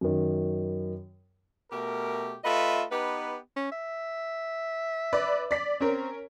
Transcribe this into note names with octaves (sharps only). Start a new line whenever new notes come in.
F#2 D#3
B2 A3 G4 A#4
A3 F4 B4 D#5 E5
B3 D#4 G4 B4
C#4
E5
B4 D5
D5 B6
C4 C#4 A#4